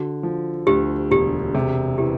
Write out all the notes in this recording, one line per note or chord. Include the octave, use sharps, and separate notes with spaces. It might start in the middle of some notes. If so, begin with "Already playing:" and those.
Already playing: D3 F#4
F3
D2 G4
E1 G4
C3 G#4
E3 G4